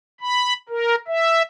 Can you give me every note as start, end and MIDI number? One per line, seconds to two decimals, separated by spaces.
0.21 0.53 83
0.69 0.95 70
1.08 1.42 76